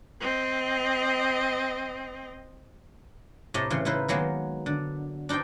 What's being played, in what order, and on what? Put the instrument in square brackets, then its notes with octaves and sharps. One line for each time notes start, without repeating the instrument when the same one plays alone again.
[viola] C4 D#5
[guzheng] A2 C3 G4 D#5 A5 A#5
A2 C#3 E3 C6
C#3 D#4 E4 B4 C5
D#3 F#3 G#3 A#3 B3
D3
D4 D#4 A4 C5 G5